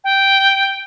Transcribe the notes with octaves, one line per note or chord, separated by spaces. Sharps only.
G5